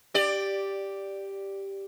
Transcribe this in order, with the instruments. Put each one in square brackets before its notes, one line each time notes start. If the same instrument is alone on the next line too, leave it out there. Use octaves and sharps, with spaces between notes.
[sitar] G4 D5